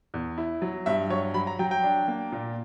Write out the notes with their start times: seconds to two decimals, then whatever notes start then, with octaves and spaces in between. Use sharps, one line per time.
0.14 E2
0.38 E4
0.62 F#3
0.86 G2 E5
1.10 F#3 C#5
1.34 F#3 B5
1.47 A#5
1.59 F#3 G5
1.71 G5
1.83 D4
2.08 A#3
2.32 A#2